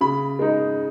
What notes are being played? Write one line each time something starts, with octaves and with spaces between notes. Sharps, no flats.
C#3 B5
G#3 D#4